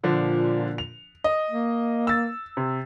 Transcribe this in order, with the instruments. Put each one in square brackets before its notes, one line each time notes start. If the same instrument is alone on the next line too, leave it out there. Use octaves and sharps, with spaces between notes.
[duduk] A#2 [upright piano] D3 F3 D4
[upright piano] F7
D#5
[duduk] A#3
[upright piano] E6 A6
C3